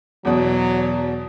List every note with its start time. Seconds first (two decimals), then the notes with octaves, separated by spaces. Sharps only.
0.25 E2 B2 F#3